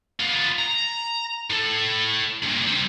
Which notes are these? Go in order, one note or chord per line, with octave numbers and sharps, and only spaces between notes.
B3 F4
A#5
A2 A4
G2 A#2
G3 C4